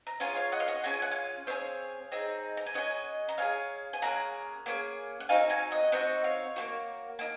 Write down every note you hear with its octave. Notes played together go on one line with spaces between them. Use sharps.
A#5
C#4 F4 G#4 F5 G#5
C#5 F5
D#5 F#5
F5
D#5 F#5
C#4 F4 G#4 A#5
G#5
F#5
F5 G#5
C4 D#4 G#4 C#5 F5
C4 D#4 G#4
A#5
G#5
C#4 G#4 D#5 F#5
A#5
C#4 G#4 F5 G#5
G#5
A#3 C#4 G#4 F#5 A#5
A#3 C#4 G#4
F#5
C4 D#4 F#4 F5 G#5
F5 G#5
D#5 F#5
C4 D#4 F#4 D#5 F#5
C#5 F5
A#3 D#4 F#4
A#3 D#4